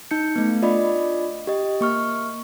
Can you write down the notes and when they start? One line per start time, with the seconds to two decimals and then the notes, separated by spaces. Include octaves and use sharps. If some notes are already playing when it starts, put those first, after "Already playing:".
0.11 D#4 G6 C#7
0.36 A3 B3
0.62 D4 F4 D5 D#5 B5
1.47 G4 D#5
1.81 A#3 C#6 F6